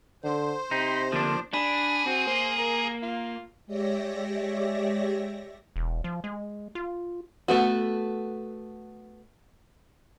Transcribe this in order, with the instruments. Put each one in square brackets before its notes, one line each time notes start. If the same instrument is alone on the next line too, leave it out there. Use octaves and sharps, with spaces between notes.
[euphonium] D3 [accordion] C5
[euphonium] C3 [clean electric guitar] D#4 [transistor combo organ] G5 B5 C6
[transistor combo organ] D3 A#3 [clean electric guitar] F3 D4
[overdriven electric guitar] D4 [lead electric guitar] G#4 [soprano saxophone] B5
[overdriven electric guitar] C4 [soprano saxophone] F#4
[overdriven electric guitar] A#3 [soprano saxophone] C5
[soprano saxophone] A#4
F4
[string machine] G#3 G4 C#5 D5 E5 A#6
[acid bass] E1
F3
G#3
F4
[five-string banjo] A3 B3 F#4